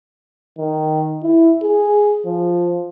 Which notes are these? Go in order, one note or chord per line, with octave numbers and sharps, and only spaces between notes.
D#3
E4
G#4
F3